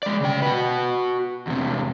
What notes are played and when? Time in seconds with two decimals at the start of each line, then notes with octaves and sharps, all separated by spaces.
0.03 G#3 D5
0.20 C#3 G5
0.42 F#4 B4
1.47 E2 C3